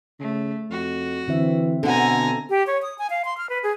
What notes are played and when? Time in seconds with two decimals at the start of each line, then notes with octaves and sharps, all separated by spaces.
0.19 C#3 A3
0.70 F2 F#4
1.28 D3 E3 C4 E5
1.83 B2 D3 A4 F#5 G#5 A#5
2.49 G4
2.67 C#5
2.82 D#6
2.98 G#5
3.10 F5
3.25 C6
3.38 F6
3.50 B4
3.63 G#4